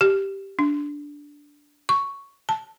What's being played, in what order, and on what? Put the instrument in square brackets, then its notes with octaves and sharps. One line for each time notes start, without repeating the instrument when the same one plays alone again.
[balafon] G4
D4
C#6
A5